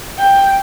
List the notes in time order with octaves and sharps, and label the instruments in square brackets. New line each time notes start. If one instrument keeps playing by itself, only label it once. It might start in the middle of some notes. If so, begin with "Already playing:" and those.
[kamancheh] G5